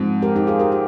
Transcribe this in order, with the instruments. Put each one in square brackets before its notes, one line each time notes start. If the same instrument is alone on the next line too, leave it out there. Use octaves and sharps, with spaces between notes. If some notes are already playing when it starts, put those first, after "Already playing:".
Already playing: [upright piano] G#2 F3 C4
[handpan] G4 A#4
D#4 G4
F4 G#4
G4 A#4
G4